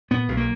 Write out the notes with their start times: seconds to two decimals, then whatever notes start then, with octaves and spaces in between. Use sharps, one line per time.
0.11 A#2 B3
0.29 B1
0.37 A#3